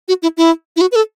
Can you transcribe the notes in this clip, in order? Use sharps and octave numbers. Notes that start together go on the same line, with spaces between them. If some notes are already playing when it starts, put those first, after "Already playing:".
F#4
E4
E4
E4
F#4
B4
A4